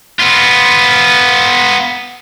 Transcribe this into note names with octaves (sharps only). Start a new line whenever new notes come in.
B3 F4